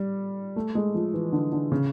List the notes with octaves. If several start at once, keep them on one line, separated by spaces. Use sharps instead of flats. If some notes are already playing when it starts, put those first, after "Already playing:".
Already playing: G3
A3
G#3
F3
E3
D3
D3
C#3